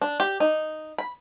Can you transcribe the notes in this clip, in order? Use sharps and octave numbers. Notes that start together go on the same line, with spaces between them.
D4
G4
D#4
B5